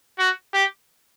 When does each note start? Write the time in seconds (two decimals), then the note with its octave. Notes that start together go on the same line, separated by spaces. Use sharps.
0.19 F#4
0.54 G4